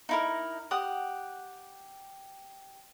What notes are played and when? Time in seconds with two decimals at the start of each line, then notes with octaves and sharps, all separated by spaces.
0.09 D#4 E4 A#4
0.71 G4 F#5 D#6